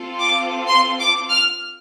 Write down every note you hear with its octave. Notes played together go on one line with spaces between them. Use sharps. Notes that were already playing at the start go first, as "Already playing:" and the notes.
Already playing: C4 F4 A4
D6
C6
D6
F6